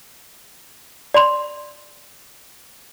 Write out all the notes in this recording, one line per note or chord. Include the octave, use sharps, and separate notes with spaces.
D5 B5 C6 F7